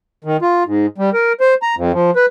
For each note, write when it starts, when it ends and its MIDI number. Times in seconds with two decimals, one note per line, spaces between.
0.24 0.37 51
0.42 0.63 65
0.66 0.86 44
0.98 1.10 55
1.13 1.32 70
1.41 1.54 72
1.62 1.75 82
1.77 1.92 41
1.93 2.11 53
2.16 2.26 71